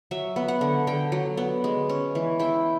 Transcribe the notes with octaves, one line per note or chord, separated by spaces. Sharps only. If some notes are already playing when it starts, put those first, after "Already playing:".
F#3 E5
B3
F#5
D3
D3 G5
F#3
B3
G#3
C#4
E3
E4 G5